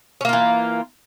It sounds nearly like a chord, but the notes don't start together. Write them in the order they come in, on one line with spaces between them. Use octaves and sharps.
C#4 A#3 F4 E3